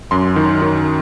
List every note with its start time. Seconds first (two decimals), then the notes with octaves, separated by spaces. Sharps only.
0.11 F#2 C6
0.36 D#3
0.62 D#3